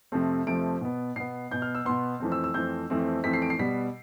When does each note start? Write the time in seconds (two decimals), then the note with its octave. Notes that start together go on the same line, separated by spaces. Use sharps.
0.12 F2 C3 F3 A3 C4
0.47 F2 C3 F3 A3 C4 D7
0.81 B2 B3
1.16 B2 B3 C7
1.51 B2 B3 G6
1.62 F6
1.75 E6
1.85 B2 B3 C6
2.20 F2 E3 A3 C4
2.32 E6
2.44 E6
2.54 F2 E3 A3 C4 G6
2.90 F2 E3 A3 C4
3.24 F2 E3 A3 C4 B6
3.33 C7
3.42 D7
3.50 C7
3.59 B2 G3 B3 B6